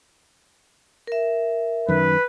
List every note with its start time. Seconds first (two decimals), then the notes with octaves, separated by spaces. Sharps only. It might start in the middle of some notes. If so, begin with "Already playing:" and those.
1.07 A#4 E5
1.89 F#2 D#3 B4